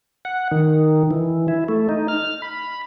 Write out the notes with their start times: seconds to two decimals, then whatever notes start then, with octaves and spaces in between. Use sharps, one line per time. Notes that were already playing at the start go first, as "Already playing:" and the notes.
0.25 F#5
0.51 D#3
1.11 E3
1.48 E4
1.69 A3
1.89 D#4
2.08 F6
2.42 B5